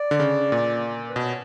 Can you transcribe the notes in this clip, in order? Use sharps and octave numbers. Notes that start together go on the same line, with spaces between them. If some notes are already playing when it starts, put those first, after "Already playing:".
Already playing: D5
D3
C#3
A#2
B4
B2
C#5